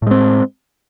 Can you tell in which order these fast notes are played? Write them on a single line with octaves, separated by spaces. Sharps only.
A2 G#3 C4